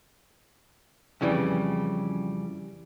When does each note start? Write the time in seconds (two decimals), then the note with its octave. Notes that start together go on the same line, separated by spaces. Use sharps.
1.21 F2 C#3 E3 G3